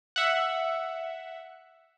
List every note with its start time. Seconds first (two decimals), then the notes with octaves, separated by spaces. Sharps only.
0.16 E5 F#5